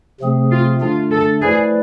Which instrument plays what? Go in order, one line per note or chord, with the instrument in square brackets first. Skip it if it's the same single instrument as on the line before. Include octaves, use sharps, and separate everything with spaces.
[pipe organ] C3 F3 A3 C4 G#4
[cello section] F4
[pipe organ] D3 A3 D4 [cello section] F4
[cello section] A4
[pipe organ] F3 A3 E4 B4 D5 [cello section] G#4